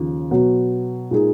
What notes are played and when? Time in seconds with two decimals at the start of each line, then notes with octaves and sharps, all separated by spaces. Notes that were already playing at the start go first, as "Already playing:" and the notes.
Already playing: D#2 C#3 F3
0.31 B2 F#3 B3
1.11 A#2 G#3 D#4 G#4